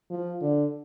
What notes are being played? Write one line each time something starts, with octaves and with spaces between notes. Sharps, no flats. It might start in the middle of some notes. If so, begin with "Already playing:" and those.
F3
D3